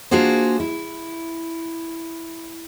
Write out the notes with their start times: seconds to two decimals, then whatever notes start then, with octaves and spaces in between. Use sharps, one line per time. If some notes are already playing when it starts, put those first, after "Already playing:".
0.11 A#3 D4 F4 F#4 G#4 C5
0.60 E4